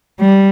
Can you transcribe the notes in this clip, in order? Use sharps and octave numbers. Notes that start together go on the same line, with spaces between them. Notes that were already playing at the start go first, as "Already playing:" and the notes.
G3